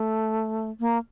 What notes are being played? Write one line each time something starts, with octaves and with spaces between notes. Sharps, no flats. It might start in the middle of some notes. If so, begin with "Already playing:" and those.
Already playing: A3
A#3